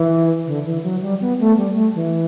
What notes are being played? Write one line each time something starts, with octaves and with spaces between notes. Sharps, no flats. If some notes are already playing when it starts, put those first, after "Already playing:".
Already playing: E3
D3
E3
F#3
G3
B3
A3
G3
A3
E3